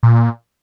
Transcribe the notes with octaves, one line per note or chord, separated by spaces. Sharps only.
A#2